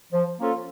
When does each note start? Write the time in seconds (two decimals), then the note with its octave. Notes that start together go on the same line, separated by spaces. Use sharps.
0.13 F3
0.39 A#3 C#4 F4 A4